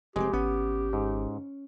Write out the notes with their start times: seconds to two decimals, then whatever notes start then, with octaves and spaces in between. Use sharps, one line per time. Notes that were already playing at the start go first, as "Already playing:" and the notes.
0.16 F1 G#3 C4 G4
0.33 G#1 B3 C#4
0.93 G#2